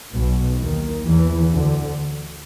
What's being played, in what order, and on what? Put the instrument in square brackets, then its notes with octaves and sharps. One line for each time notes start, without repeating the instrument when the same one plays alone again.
[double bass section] B1 B2
D#2 D#3
E2 E3
D2 D3